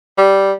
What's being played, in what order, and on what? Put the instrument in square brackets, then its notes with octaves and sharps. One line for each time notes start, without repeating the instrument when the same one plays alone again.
[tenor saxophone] G3